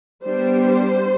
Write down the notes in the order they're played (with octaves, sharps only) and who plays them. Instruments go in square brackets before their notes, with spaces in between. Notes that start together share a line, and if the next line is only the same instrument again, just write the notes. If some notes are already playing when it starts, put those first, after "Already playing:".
[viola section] G3 B3 D4 C5